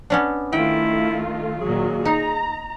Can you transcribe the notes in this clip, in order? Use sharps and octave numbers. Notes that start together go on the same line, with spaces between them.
B3 C#4 D4
D#3 A3 E4 F4 G5
A#2 D#3 F#3 G#4
D#4 A#5